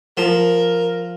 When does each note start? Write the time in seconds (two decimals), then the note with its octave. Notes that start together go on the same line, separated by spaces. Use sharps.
0.17 F3 A#4